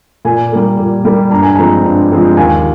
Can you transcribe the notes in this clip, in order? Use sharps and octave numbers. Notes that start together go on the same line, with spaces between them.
A#2 G#5
G3 A#3
A#2
G3 A#3
G2 A#5
G#5
F3 G#3 C4 A#5
G2
F3 G#3 C4
D#2 G#5